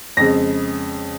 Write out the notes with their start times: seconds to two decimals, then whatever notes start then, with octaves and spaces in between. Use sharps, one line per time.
0.17 F2 C#3 G#3 A#6